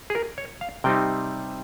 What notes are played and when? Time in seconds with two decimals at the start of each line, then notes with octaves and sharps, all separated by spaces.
0.10 G#4
0.15 A#4
0.38 C#5
0.61 F5
0.84 C3 G3 C4 D#4 G5